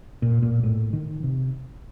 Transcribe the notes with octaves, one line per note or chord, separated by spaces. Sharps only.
A#2
A#2
A2
D#3
C3